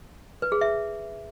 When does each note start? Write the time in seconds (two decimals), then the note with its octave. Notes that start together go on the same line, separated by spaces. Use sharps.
0.42 B4
0.52 G#4
0.61 E5